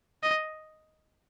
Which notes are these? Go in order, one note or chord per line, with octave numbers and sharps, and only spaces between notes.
D#5